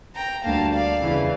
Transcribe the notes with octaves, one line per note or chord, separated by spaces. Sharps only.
G5 A#5
D2 D3 G3 A#3 F5 A5
D5 F5
E2 C#3 E3